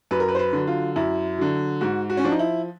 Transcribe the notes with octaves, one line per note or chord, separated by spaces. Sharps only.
F#2 B4
A#4
B4
C5
B4
D3 F#3
F4
F#2 E4
D3 F#3
G#2 F#4
F#4
C#4
F3 D4
D#4
E4